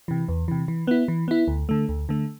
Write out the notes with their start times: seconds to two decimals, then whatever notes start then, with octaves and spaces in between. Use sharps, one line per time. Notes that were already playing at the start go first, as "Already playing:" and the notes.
0.08 C3 E3
0.29 E2
0.48 C3 E3
0.68 E3
0.87 B3 E4
1.08 E3
1.28 B3 E4
1.48 D2
1.69 D3 A3
1.89 D2
2.09 D3 A3